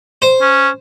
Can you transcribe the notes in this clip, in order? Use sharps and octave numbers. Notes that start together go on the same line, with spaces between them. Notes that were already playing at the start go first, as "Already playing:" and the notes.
C5
C#4